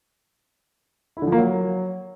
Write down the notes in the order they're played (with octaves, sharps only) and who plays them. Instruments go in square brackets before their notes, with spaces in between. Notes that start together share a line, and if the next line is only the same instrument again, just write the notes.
[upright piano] E4
D3
F3
A#3
F#3